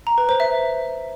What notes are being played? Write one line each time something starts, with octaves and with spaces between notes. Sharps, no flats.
A#5
B4
C5
E5